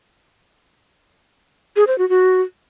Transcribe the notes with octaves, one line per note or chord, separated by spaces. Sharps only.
G#4
C5
F#4
F#4